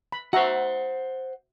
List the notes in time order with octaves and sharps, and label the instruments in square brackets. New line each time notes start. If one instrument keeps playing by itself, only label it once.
[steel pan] B5
[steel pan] F#4 E5 A#5 [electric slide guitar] C5 F#5